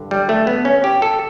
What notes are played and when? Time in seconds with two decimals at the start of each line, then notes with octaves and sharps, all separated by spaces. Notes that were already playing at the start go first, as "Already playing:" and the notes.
Already playing: G2 D3
0.11 G3
0.29 A3
0.47 B3
0.65 C#4
0.84 G4
1.02 A4